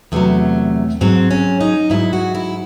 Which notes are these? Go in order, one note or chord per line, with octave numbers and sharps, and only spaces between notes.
E2 C3 F#3 A3
G#2 F#3 C4
C#4
D#4
G#2 F#3 E4
F#4
E4